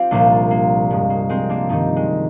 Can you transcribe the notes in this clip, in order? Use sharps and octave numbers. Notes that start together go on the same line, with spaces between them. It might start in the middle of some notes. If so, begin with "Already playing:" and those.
Already playing: C4 F4 G4
C2 A#2 F3 A#3 D4
A#3
G2 F3 G#3
A#3
G#3 C4
A#3 D4
G2 D#3 C4 D#4
G#3